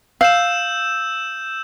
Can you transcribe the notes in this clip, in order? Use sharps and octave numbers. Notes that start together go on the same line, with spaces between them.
F5 E6 G6 E7